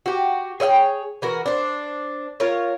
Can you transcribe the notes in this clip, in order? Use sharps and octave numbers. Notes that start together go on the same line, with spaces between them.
F#4 G4
G#4 C#5 E5 G5
E3 F#4 A#4
D4 C5
F4 A#4 C#5